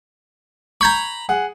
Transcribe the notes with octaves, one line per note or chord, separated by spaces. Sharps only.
A#5 B5 C#6 G6 G#6
G#4 F#5